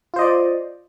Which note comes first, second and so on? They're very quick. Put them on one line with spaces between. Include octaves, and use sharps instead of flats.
F4 C5 D#5 D5